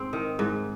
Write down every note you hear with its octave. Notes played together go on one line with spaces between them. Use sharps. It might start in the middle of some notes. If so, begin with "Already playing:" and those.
Already playing: G#2 C4
D#3
G#2